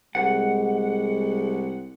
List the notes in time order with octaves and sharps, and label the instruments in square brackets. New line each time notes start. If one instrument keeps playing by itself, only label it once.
[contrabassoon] C2 [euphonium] G#3 [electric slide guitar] F#5